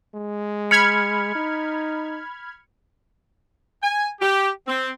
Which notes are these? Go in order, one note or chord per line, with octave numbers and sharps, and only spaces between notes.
G#3
B5 F6 G#6 C#7
D#4
G#5
G4
C4